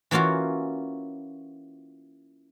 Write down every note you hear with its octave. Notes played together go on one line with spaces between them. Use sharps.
E3 A#3 C#4 F4 F#4